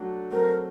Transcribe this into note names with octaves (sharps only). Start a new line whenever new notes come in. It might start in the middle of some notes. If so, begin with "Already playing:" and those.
Already playing: F#3 A3 D4 F#4
F#3 A3 C4 A#4